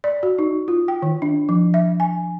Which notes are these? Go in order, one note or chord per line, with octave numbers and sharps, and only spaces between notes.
D5
F#4
D#4
F4
G5
D#3
D4
F3
E5
G#5